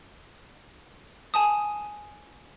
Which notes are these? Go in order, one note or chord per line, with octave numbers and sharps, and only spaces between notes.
G#5 A5 D#6